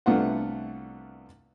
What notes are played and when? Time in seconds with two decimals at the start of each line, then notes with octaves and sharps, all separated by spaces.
0.06 C2 A3 B3 D4 F4 F#5